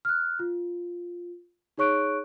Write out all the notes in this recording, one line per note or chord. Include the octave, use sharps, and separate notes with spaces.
F6 F#6
F4
D#4 G#4 C#5 C#6 F#6 D7